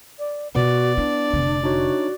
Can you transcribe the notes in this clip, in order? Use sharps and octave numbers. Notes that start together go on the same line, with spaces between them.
D5
B2 B3 F4 F#4 D5
D4 E4
F1 D3
D4 D#4 F#4 C#5